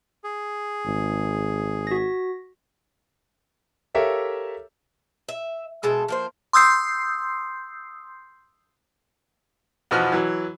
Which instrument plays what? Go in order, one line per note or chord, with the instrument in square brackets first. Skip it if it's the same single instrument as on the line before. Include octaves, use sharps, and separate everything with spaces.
[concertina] G#4
[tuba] G#1
[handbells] F#4 A#6
[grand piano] G4 A4 A#4 C#5 E5 F5
[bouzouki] E5
B2 G#3 A4 E5
F3 A#3 C5
[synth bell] C6 D#6 E6 G6 C7
[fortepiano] E2 B2 F3 F#4 F6
E3 F#3